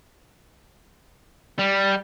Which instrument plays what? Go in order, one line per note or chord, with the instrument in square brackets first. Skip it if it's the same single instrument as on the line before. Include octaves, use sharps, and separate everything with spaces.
[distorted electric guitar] G3